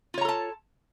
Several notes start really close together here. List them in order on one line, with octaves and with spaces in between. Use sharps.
F4 C#5 A#5 A4 A5